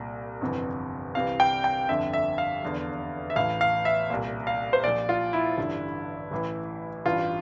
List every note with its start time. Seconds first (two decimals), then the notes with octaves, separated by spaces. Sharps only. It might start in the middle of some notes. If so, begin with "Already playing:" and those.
Already playing: C2 A#2
0.41 G1 F2 C3 E3
1.15 C2 C3 E3 F5
1.40 G5
1.64 G5
1.89 G1 F2 D3 E5
2.13 E5
2.38 F5
2.62 F1 E2 D3
3.30 E5
3.36 A1 A2 E3 F5
3.61 F5
3.85 E5
4.10 C2 A#2
4.47 F5
4.73 C5
4.84 A#1 A#2 D5
5.09 F4
5.33 E4
5.58 A1 G2 D3
6.31 A1 A2 E3
7.06 A1 G2 E3 F4